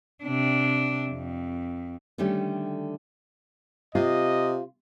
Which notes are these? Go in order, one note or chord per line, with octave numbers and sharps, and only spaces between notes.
C3 D4
F2
D3 D#3 G3 A3 C#4 G4
C3 F4 D#5